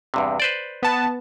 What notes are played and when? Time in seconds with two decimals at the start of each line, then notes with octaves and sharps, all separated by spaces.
0.14 E2 G2 C3
0.40 B4 C5 D5
0.83 B3 A5